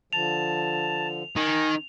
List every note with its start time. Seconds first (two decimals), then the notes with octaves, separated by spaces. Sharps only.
0.13 D3 F3 A5 F7
1.36 D#3 G#5 A#6